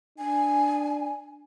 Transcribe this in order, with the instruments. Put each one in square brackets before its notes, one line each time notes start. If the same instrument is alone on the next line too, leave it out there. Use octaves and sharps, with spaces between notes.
[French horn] D4 [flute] G#5